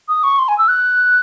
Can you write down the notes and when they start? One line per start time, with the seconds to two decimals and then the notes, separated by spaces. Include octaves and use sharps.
0.09 D#6
0.24 C#6
0.39 C6
0.48 G#5
0.58 E6
0.68 F#6